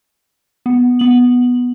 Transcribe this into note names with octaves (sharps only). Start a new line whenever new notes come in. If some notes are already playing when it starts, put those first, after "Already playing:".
B3
B3 F#7